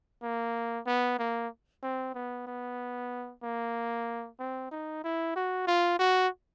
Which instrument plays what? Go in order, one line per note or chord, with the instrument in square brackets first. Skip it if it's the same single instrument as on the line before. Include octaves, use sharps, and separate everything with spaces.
[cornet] A#3
B3
A#3
C4
B3
B3
A#3
C4
D#4
E4
F#4
F4
F#4